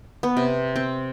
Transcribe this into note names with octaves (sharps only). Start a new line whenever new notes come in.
B3
C3
C4